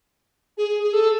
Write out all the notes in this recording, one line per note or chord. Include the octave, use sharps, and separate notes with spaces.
G#4
G#4
A4